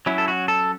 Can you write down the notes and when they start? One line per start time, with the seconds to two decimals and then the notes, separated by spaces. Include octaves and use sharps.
0.06 F#3 C#4 E4
0.18 A4
0.28 F#4
0.48 A4